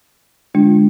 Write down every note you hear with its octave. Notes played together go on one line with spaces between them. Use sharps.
D3 G#3 D4 F4